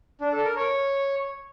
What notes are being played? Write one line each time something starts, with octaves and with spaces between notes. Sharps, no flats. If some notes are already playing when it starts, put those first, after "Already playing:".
D4
A4
A#4
C#5